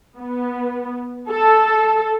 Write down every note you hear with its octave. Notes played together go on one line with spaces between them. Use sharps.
B3
A4